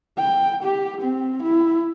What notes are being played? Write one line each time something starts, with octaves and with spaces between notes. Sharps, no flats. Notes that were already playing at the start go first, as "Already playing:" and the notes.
G5
G4
C4
E4